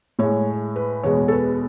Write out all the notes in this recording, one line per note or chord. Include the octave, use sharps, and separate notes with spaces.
A2 G#3 C#5
B4
E2 B2 G#3 C#5
A4
B4